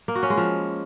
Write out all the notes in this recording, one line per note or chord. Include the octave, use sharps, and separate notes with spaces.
A#3
F#4
C#4
G#3
F3